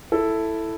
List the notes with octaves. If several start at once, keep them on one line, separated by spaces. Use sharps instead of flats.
E4 A4